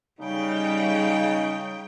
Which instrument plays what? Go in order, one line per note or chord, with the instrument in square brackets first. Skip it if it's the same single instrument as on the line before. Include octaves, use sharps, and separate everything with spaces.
[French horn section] C#3 D#4 [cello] G3 G5